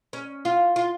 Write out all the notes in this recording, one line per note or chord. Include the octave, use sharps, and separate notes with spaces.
C#4
F4
F4